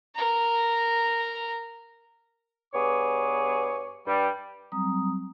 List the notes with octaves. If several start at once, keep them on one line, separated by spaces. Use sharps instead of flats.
A#4 A#5
G2 B3 G#4 C#5 D6
G2 G3
F#3 G3 C4 A#5 D#6